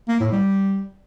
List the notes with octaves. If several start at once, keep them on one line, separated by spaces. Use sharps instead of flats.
A#3
A2
G3